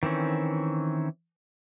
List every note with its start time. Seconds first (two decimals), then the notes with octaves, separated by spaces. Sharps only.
0.03 D#3 E3 C4 C#4